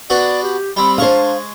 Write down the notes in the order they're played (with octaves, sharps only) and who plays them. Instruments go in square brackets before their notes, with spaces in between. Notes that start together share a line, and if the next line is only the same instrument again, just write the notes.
[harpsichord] B3 D4 F#4 [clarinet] D5
[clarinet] G4
[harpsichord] G3 C4 [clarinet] B5
[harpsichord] G#3 C#6 D#6 [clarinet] D4 [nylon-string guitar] C5 F5